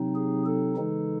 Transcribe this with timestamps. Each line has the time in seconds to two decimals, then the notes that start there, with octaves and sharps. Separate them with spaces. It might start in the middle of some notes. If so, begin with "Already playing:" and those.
Already playing: C3 F#3 C4 D#4
0.16 G#4
0.46 A4
0.77 C#3 E3 G#3 D#4